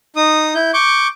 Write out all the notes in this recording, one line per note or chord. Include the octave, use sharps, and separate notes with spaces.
D#4 D#6
E4 G6
C#6 D6 G6